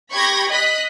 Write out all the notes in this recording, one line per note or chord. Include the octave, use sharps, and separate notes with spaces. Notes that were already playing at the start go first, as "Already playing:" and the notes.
G4 B5 C#6 G6 G#6 A#6
D#5 D#6 F#6 B6